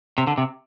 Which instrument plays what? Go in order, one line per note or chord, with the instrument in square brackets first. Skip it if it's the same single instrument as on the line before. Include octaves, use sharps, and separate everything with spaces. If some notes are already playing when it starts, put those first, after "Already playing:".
[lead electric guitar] C3
D3
C3